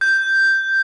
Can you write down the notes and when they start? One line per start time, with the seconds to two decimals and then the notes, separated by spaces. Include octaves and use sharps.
0.01 G6